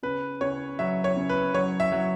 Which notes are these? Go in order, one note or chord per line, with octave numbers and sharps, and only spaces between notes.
C#3 B4
C#3 C#5
F#3 E5
C#5
C#3
B4
F#3 C#5
E5
F#3